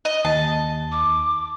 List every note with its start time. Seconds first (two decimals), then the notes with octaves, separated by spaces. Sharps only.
0.05 D#5
0.25 D#2 A5
0.92 D6